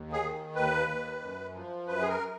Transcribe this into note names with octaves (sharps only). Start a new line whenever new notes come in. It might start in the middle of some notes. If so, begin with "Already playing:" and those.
Already playing: D#2
G#4
D#3
D#2 B4
D#2
F#2
F3
F#2 B4
G#4
A#4